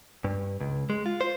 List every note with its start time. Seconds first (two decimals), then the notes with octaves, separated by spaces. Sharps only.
0.24 G2
0.60 C#2
0.90 G#3
1.06 F4
1.21 C5